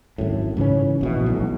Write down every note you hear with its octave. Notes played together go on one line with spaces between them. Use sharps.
G#1 F#2 A2
G#2 C#3 E3 C#4
A#1 B2 E3
B1 A2